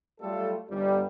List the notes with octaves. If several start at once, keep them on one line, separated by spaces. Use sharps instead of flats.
F#3 G3 A3 F4 A4
G1 G3